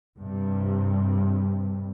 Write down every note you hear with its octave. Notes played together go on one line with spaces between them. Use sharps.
G2 C3